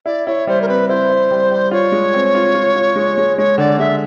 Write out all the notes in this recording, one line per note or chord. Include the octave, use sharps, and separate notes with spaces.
E4 D5
E4 C#5
G3 C5
A#4
C4 B4
E4 C5
E4
G3
G3
F4 C#5
G#3
C4
F4
F4
F4
G#3
G#3
G#3 C#5
D3 D5
G#3 E5